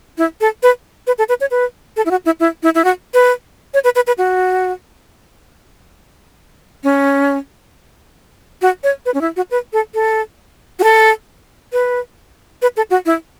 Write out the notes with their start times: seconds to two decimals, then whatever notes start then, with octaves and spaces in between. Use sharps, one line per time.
0.18 E4
0.41 A4
0.63 B4
1.07 B4
1.18 A4
1.29 B4
1.41 C#5
1.51 B4
1.96 A4
2.06 E4
2.11 F#4
2.25 E4
2.40 E4
2.63 E4
2.75 E4
2.84 F#4
3.14 B4
3.74 C#5
3.84 B4
3.95 B4
4.07 B4
4.18 F#4
6.84 C#4
8.62 F#4
8.84 C#5
9.06 B4
9.14 C#4
9.21 E4
9.36 F#4
9.51 B4
9.73 A4
9.94 A4
10.79 F#4
10.84 A4
11.73 B4
12.62 B4
12.77 A4
12.90 F#4
13.06 E4